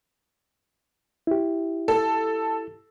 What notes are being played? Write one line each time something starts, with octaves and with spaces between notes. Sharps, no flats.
E4 G4
A4